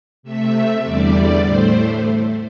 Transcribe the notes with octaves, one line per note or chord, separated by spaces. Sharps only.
C3 A3 E5
E2 D3 G3 D5
A2 A3 C5